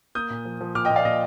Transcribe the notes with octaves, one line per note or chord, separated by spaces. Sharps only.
A#3 D#6 G6
A#2
F3
F3
A#2 D6 F6
D#5 G5
A#2
D5 F5
A#2 D#5